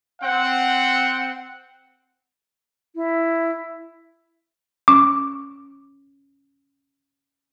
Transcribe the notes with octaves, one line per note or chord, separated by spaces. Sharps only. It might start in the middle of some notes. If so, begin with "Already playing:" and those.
C4 F#5
E4
C#4 D6